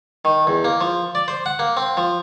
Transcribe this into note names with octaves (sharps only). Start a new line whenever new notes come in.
D#3
E2
A#3
F3
D5
C5
F#5
A#3
C4
F3